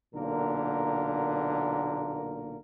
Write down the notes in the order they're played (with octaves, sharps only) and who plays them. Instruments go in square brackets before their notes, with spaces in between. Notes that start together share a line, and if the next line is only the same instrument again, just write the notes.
[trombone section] B1 A#2 D3 A#3 A#4